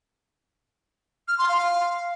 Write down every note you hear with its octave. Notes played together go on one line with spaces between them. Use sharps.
F6
C6
F5